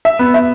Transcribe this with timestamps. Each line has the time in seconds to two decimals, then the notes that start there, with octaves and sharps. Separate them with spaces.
0.05 E5
0.19 B3
0.34 E5